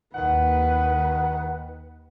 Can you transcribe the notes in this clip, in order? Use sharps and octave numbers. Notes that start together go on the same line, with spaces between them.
D#2 D#3 B4 F#5